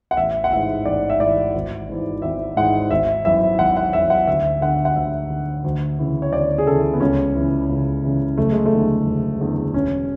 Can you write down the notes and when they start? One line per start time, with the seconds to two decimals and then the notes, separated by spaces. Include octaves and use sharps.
0.11 F#5
0.17 A1 E5
0.44 F#5
0.52 G#2 E3 E5
0.86 A1 D5
1.10 E5
1.19 G#2 E3 D5
1.55 G#1
1.88 G#2 E3
2.22 G#1 E5
2.57 G#2 E3 F#5
2.91 G#1 E5
3.25 F#2 E3 E5
3.59 G#1 F#5
3.77 F#5
3.93 F#2 E3 E5
4.10 F#5
4.27 D2 E5
4.61 D3 F#5
4.85 F#5
4.95 D2 E5
5.30 D3
5.64 D2
5.99 C#3 E3
6.22 C#5
6.32 D2 D5
6.58 G#4
6.66 C#3 E3 A4
6.94 B3
7.00 C#2 C#4
7.35 C#3 E3
7.69 C#2
8.03 C#3 E3
8.38 F#1 A3
8.52 G#3
8.66 A3
8.72 E2 D3
9.06 F#1
9.41 E2 D3
9.73 E1 C#4